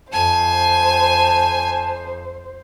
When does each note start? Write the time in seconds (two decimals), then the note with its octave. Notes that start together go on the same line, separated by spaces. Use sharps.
0.13 F2 C5 G#5 A5